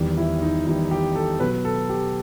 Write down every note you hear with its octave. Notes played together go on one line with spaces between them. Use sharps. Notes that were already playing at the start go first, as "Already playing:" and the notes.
Already playing: E2 D#3 G3
E4
D#4
E2 D#3 G3 E4
G4
A4
B2 F#3 B4
A4
G4